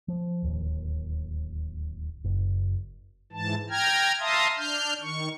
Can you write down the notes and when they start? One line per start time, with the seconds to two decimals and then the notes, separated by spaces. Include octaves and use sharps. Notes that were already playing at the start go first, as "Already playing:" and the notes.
0.08 F3
0.43 D1 D#2
2.24 F#1
3.32 G#2 E3 A5
3.70 G5 A#5 F6 G#6
4.20 E5 F5 A5 A#5 C6 D#6
4.57 D4 F6 G6
5.01 D#3 C#6